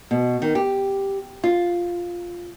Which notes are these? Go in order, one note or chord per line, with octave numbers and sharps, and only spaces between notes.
B2
D#3
G4
F4